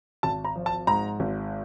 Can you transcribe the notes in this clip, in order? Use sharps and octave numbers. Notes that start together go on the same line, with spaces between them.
G#1 A5
A#5
F3
A5
G#2 A#5
G#1